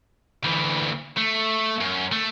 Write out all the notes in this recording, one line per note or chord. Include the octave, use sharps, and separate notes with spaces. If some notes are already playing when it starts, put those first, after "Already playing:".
D2 E3
A3
F#2
A3